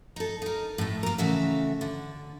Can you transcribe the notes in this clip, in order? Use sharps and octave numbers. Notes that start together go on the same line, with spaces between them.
D#4 A4
D#4 A#4
A2 A3
A#3 A#4
C#3 E3 A3 F#4 A4 E5
D3